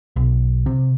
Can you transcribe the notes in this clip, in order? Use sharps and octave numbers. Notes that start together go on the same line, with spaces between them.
B1
C3